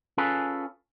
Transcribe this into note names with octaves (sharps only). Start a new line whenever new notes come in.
C#4 F4 G#4 A4 B4